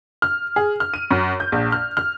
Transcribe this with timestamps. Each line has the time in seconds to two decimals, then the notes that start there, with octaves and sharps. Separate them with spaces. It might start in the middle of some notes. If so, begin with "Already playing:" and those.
0.22 F6
0.56 G#4
0.80 F6
0.94 D#7
1.11 F#2
1.40 G6
1.52 A#1
1.72 F6
1.97 F6